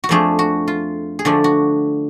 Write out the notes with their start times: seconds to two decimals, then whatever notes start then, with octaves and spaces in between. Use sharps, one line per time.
0.04 F#4
0.09 F2 F3 A3 D4 G#4
0.39 F#4
0.68 F4
1.19 G#4
1.25 D3 F3 A3 D4 F#4
1.44 F#4